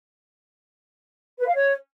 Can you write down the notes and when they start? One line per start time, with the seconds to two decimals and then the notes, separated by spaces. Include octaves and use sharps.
1.39 B4
1.47 F5
1.55 C#5